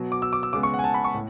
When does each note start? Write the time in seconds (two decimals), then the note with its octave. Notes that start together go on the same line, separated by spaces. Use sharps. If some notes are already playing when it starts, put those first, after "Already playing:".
Already playing: B2 F#3 B3
0.12 D6
0.22 E6
0.33 D6
0.43 E6
0.53 C#3 G#3 B3 D6
0.63 C#6
0.74 F#5
0.79 G#5
0.84 A5
0.94 B5
1.04 C#6
1.14 A2